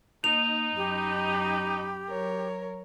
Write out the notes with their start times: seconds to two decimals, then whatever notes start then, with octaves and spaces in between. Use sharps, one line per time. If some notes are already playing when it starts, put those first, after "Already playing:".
0.24 A#3 D#4 F7
0.77 F#2 G4 B5
2.08 F#3 A#4 C#5